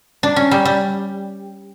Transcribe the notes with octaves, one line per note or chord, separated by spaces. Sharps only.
D4
C#4
G3
G3